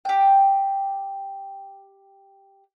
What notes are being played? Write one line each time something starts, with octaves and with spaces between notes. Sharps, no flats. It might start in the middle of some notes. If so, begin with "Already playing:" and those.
G4 G5